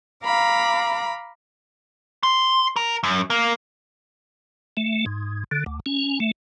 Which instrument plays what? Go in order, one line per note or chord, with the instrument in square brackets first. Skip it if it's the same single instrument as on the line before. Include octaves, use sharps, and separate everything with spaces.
[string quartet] F5 A#5 B5 D6
[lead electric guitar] C6
A#4
F#2
A#3
[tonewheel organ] A3
G#2
D3
D2
C#4
A3